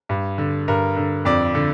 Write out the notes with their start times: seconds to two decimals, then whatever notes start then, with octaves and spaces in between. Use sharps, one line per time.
0.09 G2
0.38 D3
0.68 G2 A#4
0.97 D3
1.25 F2 D5
1.55 D3